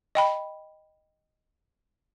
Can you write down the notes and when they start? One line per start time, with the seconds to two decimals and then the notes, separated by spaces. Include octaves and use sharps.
0.15 D#5 G5 B5